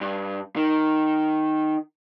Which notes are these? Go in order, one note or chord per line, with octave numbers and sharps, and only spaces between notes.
G2
D#3